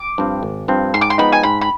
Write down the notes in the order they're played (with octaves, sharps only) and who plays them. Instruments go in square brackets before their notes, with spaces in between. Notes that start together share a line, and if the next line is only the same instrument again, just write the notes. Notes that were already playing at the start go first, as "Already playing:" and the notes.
Already playing: [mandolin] D6
[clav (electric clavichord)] G2 F3 C4
G#1
G2 F3 C4
[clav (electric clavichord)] G#2 [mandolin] C6
[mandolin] D6
C6
[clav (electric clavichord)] F3 G#3 B3 D#4 [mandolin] B5
[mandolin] G#5
[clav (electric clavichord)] G#2 [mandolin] B5
[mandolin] B5